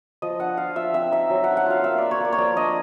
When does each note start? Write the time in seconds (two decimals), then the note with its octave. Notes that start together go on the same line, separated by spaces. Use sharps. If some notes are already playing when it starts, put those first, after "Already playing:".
0.22 F3 D#5
0.40 D4 F#5
0.57 F4 F5
0.76 F3 E5
0.94 C4 E5
1.12 D#4 E5
1.30 F#3
1.44 D4 F#5
1.57 F#5
1.66 F4 F5
1.84 A#3 E5
1.98 F4 D5
2.11 C#5
2.21 A#3 D5
2.32 C#5
2.38 F3 D5
2.56 D4 D#5